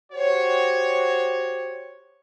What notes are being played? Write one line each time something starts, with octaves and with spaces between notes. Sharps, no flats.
F#4 G4 C5 C#5